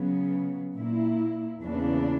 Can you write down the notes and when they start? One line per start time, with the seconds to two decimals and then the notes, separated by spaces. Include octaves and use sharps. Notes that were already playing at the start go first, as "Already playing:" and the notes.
Already playing: C#3 F#3 B3
0.76 A#2 A#3 E4
1.62 E2 C#3 E3 A#3 D4